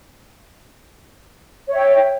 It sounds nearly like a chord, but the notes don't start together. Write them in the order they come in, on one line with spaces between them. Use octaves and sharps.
C#5 E5 G5